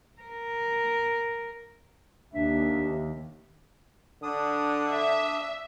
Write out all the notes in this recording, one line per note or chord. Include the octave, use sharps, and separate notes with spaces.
A#4
D#2 D4 E5
D3 D4 D#6
E5